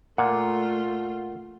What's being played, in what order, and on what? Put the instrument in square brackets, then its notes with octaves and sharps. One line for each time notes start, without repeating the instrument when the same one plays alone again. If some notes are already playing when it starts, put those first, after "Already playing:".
[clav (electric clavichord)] A#2 [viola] A3 F4 [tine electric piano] F#5